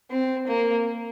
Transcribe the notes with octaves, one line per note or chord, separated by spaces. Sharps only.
C4
A#3